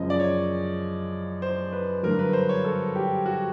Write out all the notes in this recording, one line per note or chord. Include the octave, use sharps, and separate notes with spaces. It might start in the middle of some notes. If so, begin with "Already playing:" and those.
Already playing: F#2 C#3 F3 G#3 D#5
D5
C#5
C5
B4
G2 D3 F#3 A#4
B4
C5
C#5
A4
G4
F#4